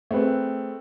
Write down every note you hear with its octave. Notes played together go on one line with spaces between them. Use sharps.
A3 C4 G#4 B4